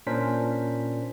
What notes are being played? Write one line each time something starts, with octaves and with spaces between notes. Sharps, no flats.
A#2 C#4 D4 A#4 C5 B6